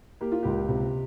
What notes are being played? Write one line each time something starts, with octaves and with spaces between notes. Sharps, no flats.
A#3 G4
F4
C#2 G4
C3